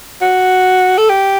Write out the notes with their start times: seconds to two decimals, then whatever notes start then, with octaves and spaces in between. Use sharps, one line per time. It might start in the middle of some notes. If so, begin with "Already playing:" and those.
0.21 F#4
0.98 A4
1.09 G4